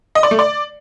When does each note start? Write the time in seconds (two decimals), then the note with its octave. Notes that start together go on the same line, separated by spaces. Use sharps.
0.15 D#5
0.23 D5
0.31 A3
0.39 D5